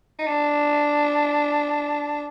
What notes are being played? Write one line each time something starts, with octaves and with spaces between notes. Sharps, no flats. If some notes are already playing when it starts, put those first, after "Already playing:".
D#4
D4